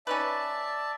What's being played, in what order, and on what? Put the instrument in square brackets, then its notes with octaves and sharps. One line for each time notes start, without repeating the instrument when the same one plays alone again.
[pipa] C#4 D#4 B4 [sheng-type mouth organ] D5 E5 A5